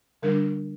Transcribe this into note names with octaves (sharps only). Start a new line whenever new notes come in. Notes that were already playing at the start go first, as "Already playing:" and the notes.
D3 G3 D4 A#4